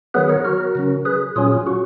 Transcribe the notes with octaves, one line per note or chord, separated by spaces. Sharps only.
D#3 F#3 B3 G#4 B4
A#4 C#5
F#4 A#4
C#3 F#3 C#4
G#4 B4
A#2 F#3 C#4 F4 G#4
F4
F#4